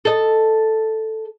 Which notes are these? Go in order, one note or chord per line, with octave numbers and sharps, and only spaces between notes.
A4 D#5